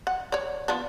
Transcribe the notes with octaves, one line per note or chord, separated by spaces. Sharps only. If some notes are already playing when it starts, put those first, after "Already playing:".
F#5
C#5 D5
F3 B3 D4